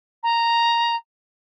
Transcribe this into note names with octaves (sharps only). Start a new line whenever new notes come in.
A#5